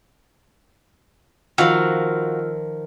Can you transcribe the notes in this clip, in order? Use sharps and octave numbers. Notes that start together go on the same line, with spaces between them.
D#3 F3 F4 F#4 F5 E6 F6